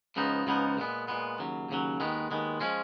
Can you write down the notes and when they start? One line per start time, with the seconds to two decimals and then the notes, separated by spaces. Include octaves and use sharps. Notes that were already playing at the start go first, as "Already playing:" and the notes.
0.16 C#2 C#3 F3 B3 D#4
0.47 C#2 C#3 F3 B3 D#4
0.78 A#2 G#3 B3
1.08 A#2 G#3 B3
1.39 D#2 C#3 F#3
1.69 D#2 C#3 F#3
2.00 D#2 D#3 G#3 B3
2.31 D#2 D#3 G#3 B3
2.60 F3 G#3 C#4